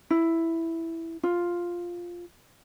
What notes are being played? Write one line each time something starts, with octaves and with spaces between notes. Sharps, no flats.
E4
F4